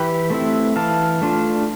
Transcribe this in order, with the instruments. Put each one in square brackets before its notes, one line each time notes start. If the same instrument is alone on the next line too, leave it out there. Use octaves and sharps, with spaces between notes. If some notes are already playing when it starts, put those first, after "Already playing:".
Already playing: [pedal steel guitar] E3 G4 B4
A3 C4 E4
E3 F5 A5
A3 D4 F4